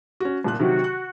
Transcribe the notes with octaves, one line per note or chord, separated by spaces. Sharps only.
C#4 F#4
C2 A#2 F#6
C3 D#3 F#3 F#4
F#6